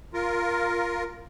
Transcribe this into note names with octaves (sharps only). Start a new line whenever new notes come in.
F4 A#4